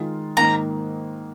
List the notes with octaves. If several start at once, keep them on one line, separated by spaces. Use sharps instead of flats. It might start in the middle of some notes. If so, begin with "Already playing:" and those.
Already playing: D#3 G#3 F4
G#2 D#3 A#3 A#5